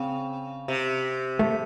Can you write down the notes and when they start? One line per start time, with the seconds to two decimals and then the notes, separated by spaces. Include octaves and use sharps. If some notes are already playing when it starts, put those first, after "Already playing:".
Already playing: C#3 C4
0.68 C3
1.39 A3